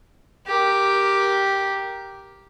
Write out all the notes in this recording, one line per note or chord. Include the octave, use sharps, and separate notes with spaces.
G4 A#4